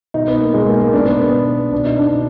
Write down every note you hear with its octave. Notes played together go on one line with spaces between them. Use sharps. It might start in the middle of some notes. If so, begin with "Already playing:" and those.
B2 D#4
B3
A#3
B2 G#3
A#3
A#3
B2 D4
B3
B3
B2
B2 D4
D#4
D4
B2